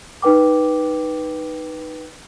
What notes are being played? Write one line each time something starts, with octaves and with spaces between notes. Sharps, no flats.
D#4 B4 G5 D6